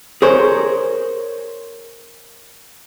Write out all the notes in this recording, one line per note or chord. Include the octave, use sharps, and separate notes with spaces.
G#4 A#4 C5 C#5